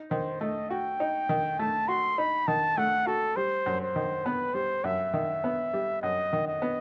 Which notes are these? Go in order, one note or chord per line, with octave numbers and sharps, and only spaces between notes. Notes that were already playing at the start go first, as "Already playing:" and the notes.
Already playing: D#4
D#3 C5
A3 D#5
F#4 G5
D#4
D#3
A3 A5
F#4 C6
D#4 B5
D#3 A5
A3 F#5
F#4 A4
G3 C5
F#2
C5
D#3
B3 B4
G3 C5
F#2 E5
D#3
B3
G3
F#2 D#5
D#3
D#5
B3